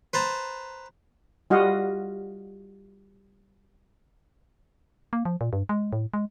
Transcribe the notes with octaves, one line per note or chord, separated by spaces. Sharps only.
B4 C5 A5 A#5
G3 F4 F#4 D#5 F5 F#5
A#3
F3
A#2
G2
G#3
A2
G#3